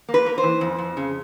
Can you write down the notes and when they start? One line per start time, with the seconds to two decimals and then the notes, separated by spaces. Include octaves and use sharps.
0.09 A#3
0.14 B4
0.26 A#3
0.38 C5
0.43 E3
0.61 F2
0.79 F2
0.97 C#3